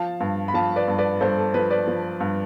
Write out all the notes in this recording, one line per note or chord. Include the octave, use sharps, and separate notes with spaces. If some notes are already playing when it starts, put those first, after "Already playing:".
Already playing: F3 F5 A5
G2
B5
F3 F5 A5
B4 D5
G2
B4 D5
G2 A4 C5
A4
F3 B4
B4 D5
F3
G2